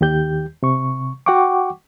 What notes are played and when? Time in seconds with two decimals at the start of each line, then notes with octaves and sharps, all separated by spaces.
0.01 D#2 D#3 G4 G6
0.63 C3 C#6
1.26 F#4 F#5 G5 C#6 D6